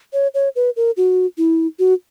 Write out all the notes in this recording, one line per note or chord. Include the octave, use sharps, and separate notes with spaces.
C#5
C#5
B4
A#4
F#4
E4
F#4